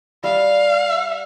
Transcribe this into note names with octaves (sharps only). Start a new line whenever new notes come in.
G3 E5 F5